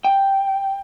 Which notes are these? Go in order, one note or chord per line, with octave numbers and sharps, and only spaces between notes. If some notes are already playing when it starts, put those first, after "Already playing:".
G5